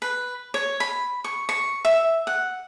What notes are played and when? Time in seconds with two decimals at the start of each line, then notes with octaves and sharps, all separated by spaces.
0.02 B4
0.54 C#5
0.80 B5
1.24 C#6
1.49 C#6
1.85 E5
2.27 F#5